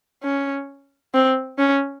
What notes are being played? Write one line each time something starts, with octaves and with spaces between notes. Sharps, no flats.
C#4
C4
C#4